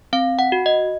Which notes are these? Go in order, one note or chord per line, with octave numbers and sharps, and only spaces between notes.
C4 F5
F#5
F#4
D#5